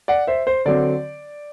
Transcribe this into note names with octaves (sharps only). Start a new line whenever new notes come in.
D5 F#5
C5 E5
C5
D3 F#3 C4 D5